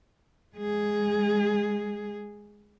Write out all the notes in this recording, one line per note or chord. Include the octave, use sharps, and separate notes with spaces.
G#3 G#4